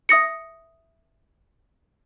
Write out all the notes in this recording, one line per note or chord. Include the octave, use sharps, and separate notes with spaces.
E5 D#6 A#6 C#7